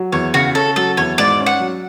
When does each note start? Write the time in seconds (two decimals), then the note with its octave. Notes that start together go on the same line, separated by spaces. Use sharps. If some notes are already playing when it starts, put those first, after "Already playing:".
Already playing: F#3
0.12 E2 C#5
0.34 C#3 F#4
0.55 C#4 A4
0.76 F#3 A4
0.97 E2 C#5
1.18 G#2 D5
1.40 C#4
1.46 F#5
1.60 F#3